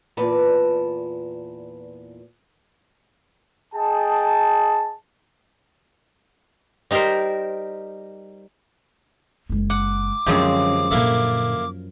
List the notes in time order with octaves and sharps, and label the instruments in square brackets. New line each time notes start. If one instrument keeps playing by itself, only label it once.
[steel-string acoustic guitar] E2 A#2 B4 D5 A5
[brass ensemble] G#4 D#5 G5 A5
[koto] G3 D#4 G4 A#4 C5
[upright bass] F#1 G#3
[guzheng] F#5 [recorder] D6
[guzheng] F#2 F3 G4 [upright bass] D3 [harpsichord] G#3 C4
[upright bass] A#2 D3 [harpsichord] A#3 E4 A4